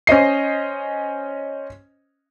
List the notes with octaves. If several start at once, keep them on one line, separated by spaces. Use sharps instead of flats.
C#4 C5 D#5 C7